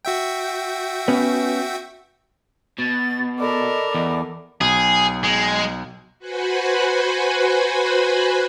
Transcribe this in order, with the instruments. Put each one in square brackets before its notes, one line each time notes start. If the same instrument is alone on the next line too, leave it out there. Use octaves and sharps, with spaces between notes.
[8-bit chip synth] F#4 E5 G5
[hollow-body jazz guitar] B3 C#4
[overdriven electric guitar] B2 [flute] A6
[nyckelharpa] A4 A#4 [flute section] D5 D#5 B5 [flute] D6
[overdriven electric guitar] E2
[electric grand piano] B1 [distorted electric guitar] G#4
[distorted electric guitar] G#3
[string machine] F#4 B4 C5 F#5 G#5 B5